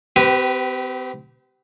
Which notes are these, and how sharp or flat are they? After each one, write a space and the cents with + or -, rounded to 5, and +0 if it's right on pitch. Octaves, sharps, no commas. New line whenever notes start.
C4 -40 G4 -25 B4 +0